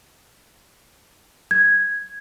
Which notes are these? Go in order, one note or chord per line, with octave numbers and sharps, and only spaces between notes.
G#6